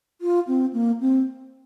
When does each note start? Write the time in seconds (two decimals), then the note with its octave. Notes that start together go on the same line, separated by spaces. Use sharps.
0.21 F4
0.47 C4
0.73 A#3
1.01 C4